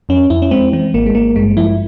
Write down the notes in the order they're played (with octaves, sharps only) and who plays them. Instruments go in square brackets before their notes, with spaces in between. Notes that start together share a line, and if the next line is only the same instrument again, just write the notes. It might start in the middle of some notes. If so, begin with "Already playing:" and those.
[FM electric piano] F2 C#4
F2 E4
C#4
G#3 C4
E3 C4
G#1 A#3
G#3
G#1 A#3
G2 G#3
F3 E4